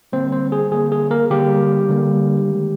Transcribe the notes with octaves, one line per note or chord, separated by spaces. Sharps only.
D3 G3 A#3 C4 C5
C4 C5
G#4
D3 G3 A#3 G#4
G#4
A#3 A#4
D3 G3 A#3 G4
D3 G3 A#3
D#3 G#3